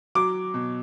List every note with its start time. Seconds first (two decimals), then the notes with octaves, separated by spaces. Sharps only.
0.15 F#3 D6
0.54 B2